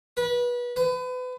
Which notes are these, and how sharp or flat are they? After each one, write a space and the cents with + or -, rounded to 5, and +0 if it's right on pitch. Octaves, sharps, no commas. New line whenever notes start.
B4 -25
B4 +35